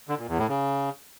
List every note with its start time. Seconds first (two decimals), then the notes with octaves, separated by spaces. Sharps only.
0.09 D3
0.19 A#2
0.28 E2
0.38 A2
0.48 C#3